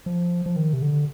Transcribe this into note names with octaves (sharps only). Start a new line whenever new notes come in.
F3
F3
D#3
C3
D3